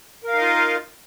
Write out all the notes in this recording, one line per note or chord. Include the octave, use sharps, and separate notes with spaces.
D#4 F4 A#4 D#5 F5